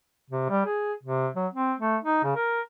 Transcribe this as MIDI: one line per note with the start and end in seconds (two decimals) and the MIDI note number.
0.30 0.46 48
0.49 0.64 55
0.66 0.93 68
1.03 1.28 48
1.36 1.47 54
1.53 1.73 60
1.79 1.97 57
2.03 2.21 63
2.23 2.34 49
2.36 2.61 70